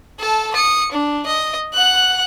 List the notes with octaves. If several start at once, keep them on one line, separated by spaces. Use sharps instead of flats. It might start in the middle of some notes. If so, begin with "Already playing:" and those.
A4 A5
D#6 C#7
D4
D#5
F#5 F#6